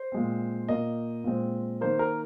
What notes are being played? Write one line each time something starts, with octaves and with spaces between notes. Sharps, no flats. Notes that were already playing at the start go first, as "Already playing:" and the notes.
Already playing: C5
A#2 G#3 C4
A#2 A#3 D#5
A#2 G#3 C4
D#3 A#3 C5
A#4